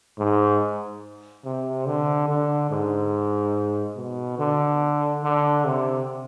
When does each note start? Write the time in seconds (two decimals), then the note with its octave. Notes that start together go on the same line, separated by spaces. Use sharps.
0.19 G#2
1.45 C3
1.86 D3
2.29 D3
2.70 G#2
3.96 B2
4.39 D3
5.24 D3
5.65 C3